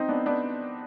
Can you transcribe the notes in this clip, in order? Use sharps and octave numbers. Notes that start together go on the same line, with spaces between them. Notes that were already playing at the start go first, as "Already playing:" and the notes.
Already playing: C4 D#4
B3 D4
B3 D4